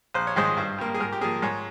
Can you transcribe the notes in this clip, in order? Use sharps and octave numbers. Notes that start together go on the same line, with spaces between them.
A#1 C5
C#5
G#2 D#3 G#3 C5
G2
G3 A#3
G#4
G#2 A#4
G4
F3 A#3 G#4
G#2 C#5